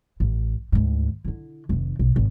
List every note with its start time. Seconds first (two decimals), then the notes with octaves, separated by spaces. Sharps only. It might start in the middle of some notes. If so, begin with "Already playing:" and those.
0.20 A1
0.72 D2 G#2
1.25 D3 E4
1.69 F1 D#3
1.99 B1
2.16 G#1